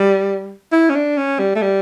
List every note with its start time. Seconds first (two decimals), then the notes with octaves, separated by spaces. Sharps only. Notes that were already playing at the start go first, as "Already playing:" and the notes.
Already playing: G3
0.72 E4
0.90 C#4
0.95 D4
1.17 C#4
1.39 G3
1.56 A3
1.62 G3